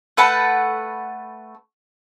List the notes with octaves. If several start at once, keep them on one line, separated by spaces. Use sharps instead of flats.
A3 B4 F#5 A5